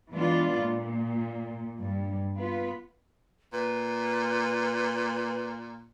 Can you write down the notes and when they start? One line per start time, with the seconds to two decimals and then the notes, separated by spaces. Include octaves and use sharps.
0.12 E3 G#3 B3 D4 F4
0.57 A#2
1.81 G2
2.37 B3 F4 B4
3.53 A#2 B4